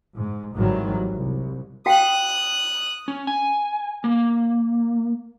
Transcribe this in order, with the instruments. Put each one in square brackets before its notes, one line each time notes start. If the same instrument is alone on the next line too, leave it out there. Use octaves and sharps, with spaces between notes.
[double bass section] G#2
G#1 G#2 D#3 E3 F#3 G3
C2
[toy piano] F#4 F5 G5 [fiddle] D#6 F#6
[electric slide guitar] C#4
G#5
A#3